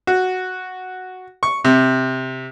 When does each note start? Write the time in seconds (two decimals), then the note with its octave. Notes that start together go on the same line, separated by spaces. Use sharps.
0.07 F#4
1.43 C#6
1.65 C3